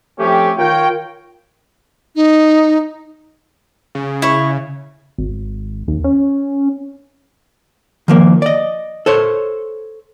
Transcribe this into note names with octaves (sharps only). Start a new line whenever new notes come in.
F3 A3 C4 C#4 G4
D#3 F4 A#4 C#5 G5
D#4
C#3
E4 C#5
G#1
D#2
C#4
D#3 F3 A#3
D5 D#5
A4 C5 C#5